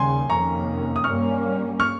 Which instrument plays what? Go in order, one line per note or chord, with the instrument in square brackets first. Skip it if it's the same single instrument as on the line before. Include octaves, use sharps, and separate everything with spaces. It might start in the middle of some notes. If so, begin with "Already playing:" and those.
Already playing: [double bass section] D#2 C#3 G3 [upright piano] G#5 C6
[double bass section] F2 C3 D#3 A#3 C#4 [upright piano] A#5 C#6
[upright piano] D#6
[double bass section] G2 G3 A#3 C#4 [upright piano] C#6 F6
[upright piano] C#6 F6